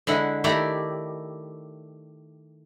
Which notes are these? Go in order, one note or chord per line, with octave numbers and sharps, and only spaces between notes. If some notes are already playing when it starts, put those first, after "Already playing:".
D3 G#3 E4 F#5
D#3 A3 E4 G4 D5 A#5